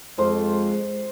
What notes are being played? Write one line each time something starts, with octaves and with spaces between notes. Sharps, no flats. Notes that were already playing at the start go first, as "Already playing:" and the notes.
F2 G#3 C5